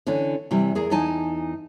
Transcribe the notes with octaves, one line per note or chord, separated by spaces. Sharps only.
D3 E3 C#4 D4
C3 E3 G3
E2 G#4 A#4
E2 E3 D#4 G#5 A5